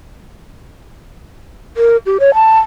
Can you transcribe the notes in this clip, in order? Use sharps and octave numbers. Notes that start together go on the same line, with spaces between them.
A#4
G4
C#5
A5